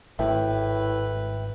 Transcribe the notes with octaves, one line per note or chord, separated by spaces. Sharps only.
G#1 A2 B4 E5 G5